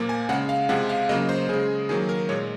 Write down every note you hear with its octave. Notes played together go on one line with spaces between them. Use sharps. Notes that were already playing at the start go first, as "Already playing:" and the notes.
Already playing: A#2 F3 A#3
G#5
C#3 G#3 F#5
F5
C3 F3 G#3 F#5
F5
C#3 F#3 A#3 D#5
C5
C#3 G#3 G#4
D#3 F#3 A#3 G#4
A#4
A#2 G#3 C#5